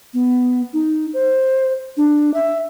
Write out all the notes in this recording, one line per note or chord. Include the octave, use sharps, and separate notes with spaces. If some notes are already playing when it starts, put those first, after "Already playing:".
B3
D#4
C5
D4
E5